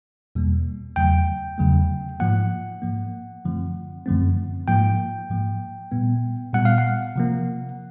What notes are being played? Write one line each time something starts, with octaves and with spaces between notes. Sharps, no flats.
E2 B2 G3 A#3
E2 C#3 F#3 A3 G5
E2 C#3 F#3 A3
G#2 F3 A#3 F#5
G#2 F3 A#3
F#2 D3 F3 A3 C4
F#2 D3 F3 A3 C4
G#2 F3 A#3 G5
G#2 F3 A#3
A#2 G3 B3
A#2 G3 B3 F#5
F5
F#5
C3 F3 A#3